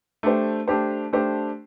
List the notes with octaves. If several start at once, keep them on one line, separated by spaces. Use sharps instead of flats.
A3 D4 G4 C5
A3 D4 G4 C5
A3 D4 G4 C5